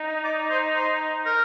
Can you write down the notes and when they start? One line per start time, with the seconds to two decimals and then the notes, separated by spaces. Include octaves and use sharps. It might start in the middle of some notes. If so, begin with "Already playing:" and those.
Already playing: D#4
0.24 D5
0.50 C5
0.75 C5
1.26 A#4